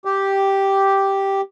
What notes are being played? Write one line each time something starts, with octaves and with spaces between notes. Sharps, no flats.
G4